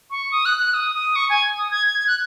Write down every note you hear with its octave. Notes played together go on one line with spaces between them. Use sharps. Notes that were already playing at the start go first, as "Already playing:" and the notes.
C#6
D#6
F#6
F#6
D#6
D#6
C#6
G#5
D#6
G#6
G#6
G#6
F#6